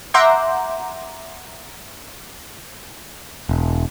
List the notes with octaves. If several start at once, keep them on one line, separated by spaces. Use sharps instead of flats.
E5 F#5 A#5 C6 D6 G6
E1